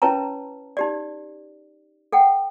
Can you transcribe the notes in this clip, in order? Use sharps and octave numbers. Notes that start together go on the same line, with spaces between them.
C#4 E4 B4 C#5 A5 A#5
D#4 G4 D5
A4 F#5 G5